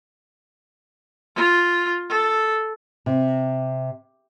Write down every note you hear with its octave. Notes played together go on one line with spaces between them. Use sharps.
F4
A4
C3